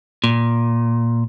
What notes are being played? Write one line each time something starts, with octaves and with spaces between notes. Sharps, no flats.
A#2